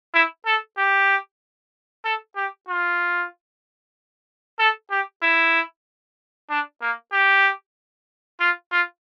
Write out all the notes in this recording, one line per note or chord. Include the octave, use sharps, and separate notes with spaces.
E4
A4
G4
A4
G4
F4
A4
G4
E4
D4
A#3
G4
F4
F4